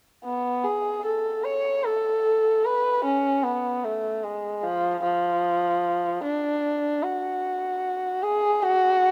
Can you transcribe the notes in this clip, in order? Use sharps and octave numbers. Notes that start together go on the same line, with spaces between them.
B3
G#4
A4
C#5
A4
B4
C#4
B3
A3
G#3
F3
F3
D4
F#4
G#4
F#4